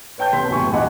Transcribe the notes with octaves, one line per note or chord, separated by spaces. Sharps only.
B4 C#5 G5 A5 G6
C2 A#3 B4 C6 B6
E1 F#2 A2 G4 G#5 C#6
A#1 D#2 D#5 F#5 G#5 D6